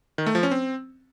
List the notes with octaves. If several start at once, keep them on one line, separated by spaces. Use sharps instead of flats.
D#3
A3
F3
C#4
C4